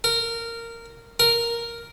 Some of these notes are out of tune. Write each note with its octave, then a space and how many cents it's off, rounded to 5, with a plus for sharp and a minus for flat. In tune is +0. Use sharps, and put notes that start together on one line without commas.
A#4 -15
A#4 +0